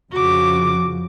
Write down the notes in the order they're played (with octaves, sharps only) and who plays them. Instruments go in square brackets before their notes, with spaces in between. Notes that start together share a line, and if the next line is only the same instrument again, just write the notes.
[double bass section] F2 C#3 F3 [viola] F#4 D6